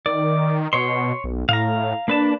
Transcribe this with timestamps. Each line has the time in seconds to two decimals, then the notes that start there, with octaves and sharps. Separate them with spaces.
0.06 D#3 D5
0.73 B2 C#5 C6
1.24 B1
1.49 A2 F5 A#5
2.08 A#3 D4 B4 A5